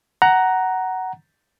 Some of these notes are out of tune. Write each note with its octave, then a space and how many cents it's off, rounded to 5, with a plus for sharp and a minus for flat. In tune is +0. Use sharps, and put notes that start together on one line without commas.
F#5 +10 A#5 +0